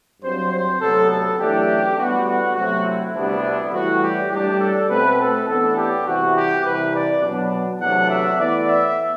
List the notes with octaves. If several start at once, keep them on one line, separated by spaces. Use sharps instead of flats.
G2 F#3 C4 C5
C5
D2 C3 F#3 B3 A4
A4
F#2 E3 A3 D4 G4
A2 G3 B3 D4 F#4
F#4
C3 F#3 A3 C4 F#4
E4
D2 C3 G3 B3 D4
A2 E3 G3 F#4
G4
A2 G3 D4 G4
A4
B2 A3 C4 B4
A4
A2 E3 B3 D4 A4
G4
C2 C3 E3 F#4
G4
C2 C3 E3 B4
D5
B2 F#3 B3 D4
E2 C3 F#3 A3 D4 F#5
E5
A2 E3 B3 D5
E5